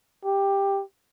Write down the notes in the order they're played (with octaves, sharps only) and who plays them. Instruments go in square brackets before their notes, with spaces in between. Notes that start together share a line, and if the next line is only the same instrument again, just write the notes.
[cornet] G4